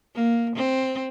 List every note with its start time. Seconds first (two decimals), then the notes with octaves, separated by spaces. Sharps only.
0.15 A#3
0.55 C4